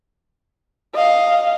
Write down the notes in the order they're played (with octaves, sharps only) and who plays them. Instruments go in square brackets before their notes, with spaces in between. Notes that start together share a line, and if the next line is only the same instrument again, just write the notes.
[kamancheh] D#5 F5